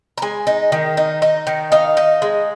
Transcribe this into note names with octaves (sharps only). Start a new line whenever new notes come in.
A#5
G#3 G#5
D#4
D#3
D#4
D#4
D#3
D#4 F5
D#4
G#3